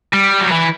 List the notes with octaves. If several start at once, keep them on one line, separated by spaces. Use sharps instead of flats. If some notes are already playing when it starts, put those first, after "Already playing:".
G3
F#3
E3